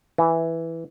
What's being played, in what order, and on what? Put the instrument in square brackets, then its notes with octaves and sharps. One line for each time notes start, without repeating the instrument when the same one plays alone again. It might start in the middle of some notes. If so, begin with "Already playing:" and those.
[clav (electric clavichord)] E3